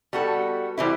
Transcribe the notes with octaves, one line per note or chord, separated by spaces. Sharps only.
G3 B3 F#4 A4
E3 G3 C4 E4